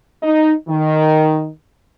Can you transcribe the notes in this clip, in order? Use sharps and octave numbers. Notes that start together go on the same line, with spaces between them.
D#4
D#3